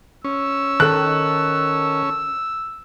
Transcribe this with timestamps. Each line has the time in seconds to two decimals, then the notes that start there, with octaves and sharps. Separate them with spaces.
0.25 C#4 E6
0.80 D#3 A4 F#6